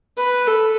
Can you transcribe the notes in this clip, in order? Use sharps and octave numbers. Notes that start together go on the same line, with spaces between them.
B4
A4